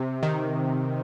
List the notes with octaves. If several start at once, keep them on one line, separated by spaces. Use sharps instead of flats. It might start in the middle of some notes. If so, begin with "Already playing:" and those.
Already playing: C3
D#3